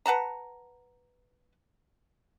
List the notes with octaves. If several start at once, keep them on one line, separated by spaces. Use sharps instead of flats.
B4 F#5 A5 A#5